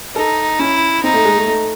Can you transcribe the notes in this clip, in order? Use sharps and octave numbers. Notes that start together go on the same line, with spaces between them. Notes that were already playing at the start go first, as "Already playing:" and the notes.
D#4 A4
C#4 E4
C4 D#4
A3
G#3
A3
A3